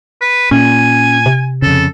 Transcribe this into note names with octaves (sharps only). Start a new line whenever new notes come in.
B4
A#2 C#4 G#5
C3
F2 C#3 A4